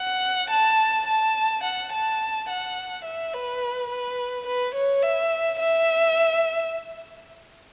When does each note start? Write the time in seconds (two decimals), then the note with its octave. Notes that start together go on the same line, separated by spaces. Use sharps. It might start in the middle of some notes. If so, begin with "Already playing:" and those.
Already playing: F#5
0.51 A5
1.07 A5
1.64 F#5
1.92 A5
2.49 F#5
3.05 E5
3.33 B4
3.90 B4
4.47 B4
4.75 C#5
5.03 E5
5.60 E5